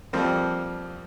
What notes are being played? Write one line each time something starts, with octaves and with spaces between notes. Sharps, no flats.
F2 F3 G3 A#3 C4